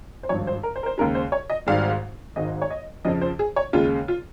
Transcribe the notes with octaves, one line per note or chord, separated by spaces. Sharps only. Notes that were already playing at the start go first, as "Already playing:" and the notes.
C5
G#1 G2 F3 C#5
C5
A#4
C5
A#4
C5
D#2 C#3 G#3 A#4
C5
C#5
D#5
G#1 G#2 G3 F5
G#1 G#2 D#3 D#5
C#5
D#5
F2 C#3 F3 D#5
C5
G#4
C#5
D#2 C#3 G#3 F4
F4